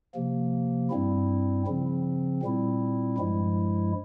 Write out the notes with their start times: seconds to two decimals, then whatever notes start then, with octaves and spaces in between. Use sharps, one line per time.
0.14 C3 F3 A#3
0.90 G2 G3 C4 E4
1.67 C#3 F3 C4
2.43 A#2 G3 C4 E4
3.18 G2 F3 G#3 E4